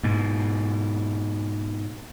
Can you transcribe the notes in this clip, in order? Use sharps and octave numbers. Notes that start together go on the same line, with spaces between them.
G#2 B2